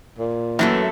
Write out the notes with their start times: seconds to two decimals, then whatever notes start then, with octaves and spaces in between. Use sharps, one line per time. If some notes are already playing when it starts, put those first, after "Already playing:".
0.19 A#2
0.59 F#2 E3 F#3 A3 A#3 A4